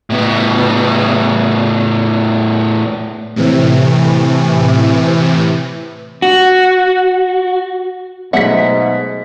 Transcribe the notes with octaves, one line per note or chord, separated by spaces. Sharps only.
A2 B3
A2 C3 E3
F#4
G#2 B2 F#3 A3 G#4 E5 F#5 B6